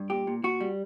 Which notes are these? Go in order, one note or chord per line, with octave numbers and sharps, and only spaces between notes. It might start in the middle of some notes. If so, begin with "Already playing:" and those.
Already playing: G2
A#2 G4
A#2
A#2 F#4
G3